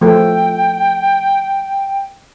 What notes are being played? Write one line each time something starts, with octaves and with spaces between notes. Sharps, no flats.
F3 A3 A4 G5